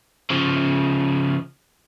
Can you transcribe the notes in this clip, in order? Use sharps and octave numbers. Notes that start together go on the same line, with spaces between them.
C#3 F3